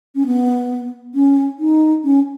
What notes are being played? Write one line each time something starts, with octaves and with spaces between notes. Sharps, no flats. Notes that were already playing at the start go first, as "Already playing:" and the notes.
C#4
B3
C#4
D#4
C#4